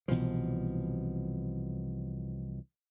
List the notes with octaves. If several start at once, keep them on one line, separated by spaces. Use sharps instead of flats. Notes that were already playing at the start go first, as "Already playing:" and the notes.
C2 B2 E3 F3